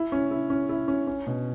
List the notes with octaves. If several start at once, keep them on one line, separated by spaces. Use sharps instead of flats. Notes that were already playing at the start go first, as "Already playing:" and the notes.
Already playing: E4
C#4
E4
C#4
E4
C#4
C#4
B2